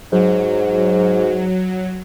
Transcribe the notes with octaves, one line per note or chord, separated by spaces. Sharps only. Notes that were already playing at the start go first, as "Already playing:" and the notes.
G#2 F#3